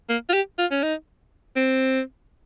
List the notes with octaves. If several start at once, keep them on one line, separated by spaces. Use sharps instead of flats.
A#3
F4
G4
F4
C#4
D#4
C4